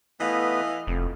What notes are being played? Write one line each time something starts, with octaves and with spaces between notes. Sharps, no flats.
E3 A3 B3 B4 D#5 F5
F1 F2